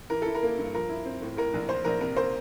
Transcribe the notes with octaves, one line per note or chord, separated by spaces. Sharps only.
E3 A#4
E4 A4
A#4
A#3
G2
F3 A#4
E4
C4
A2
A2 A#4
A#1
E3 C5
A#1 A#4
C3 A#4
A#3 C5